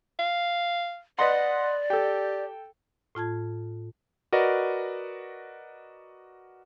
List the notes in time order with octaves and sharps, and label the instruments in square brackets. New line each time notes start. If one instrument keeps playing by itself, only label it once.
[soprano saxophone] F5
[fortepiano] B4 D#5 C6 [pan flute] D5 [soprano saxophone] F#5
[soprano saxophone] G4 [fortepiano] A4 G5
[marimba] A2 F4 A5 G#6
[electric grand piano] F#4 A#4 B4 D5 D#5